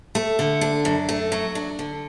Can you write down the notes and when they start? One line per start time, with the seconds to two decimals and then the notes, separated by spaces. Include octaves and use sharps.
0.15 A3
0.39 D3
0.61 D4
0.85 F#2
1.09 A3
1.32 F#3
1.55 D4
1.79 D3